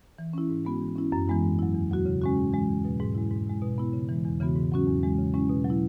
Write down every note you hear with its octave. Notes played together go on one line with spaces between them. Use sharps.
E3
C#4 E4
G#2
G#3 B3 F#4
E3
C#4 E4
F#2
E3 G#3 B3 E4
G#2
F#3 E4
E2
B2 F#3 B3 F#4
C#3
G#3 C#4 F#4
G#2
E3 G#3
E2
B2 F#3
G#2
G#3 E4
G#2
G#3 E4
B2
B3 E4
C#3
E3 G#3
E2
C#3 E3 B3 F#4
G#2
F#3 C#4 F#4
E2
E3 G#3
C#3
G#3 C#4 E4
B2
F#3
E4